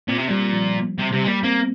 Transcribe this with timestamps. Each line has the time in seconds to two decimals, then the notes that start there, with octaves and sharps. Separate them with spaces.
0.08 A#2 C4
0.18 C3
0.28 A#2 G3
0.53 F3
0.98 C3 G3
1.13 C3 G3
1.24 G#3
1.28 G3 A#3
1.44 A#3 C4